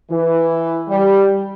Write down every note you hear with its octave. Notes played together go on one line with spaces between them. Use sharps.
E3
G3